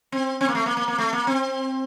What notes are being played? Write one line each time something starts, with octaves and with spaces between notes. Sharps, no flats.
C4
C4
A#3
A3
A#3
A#3
A#3
A3
A#3
C4